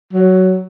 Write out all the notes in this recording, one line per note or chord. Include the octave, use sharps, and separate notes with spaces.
F#3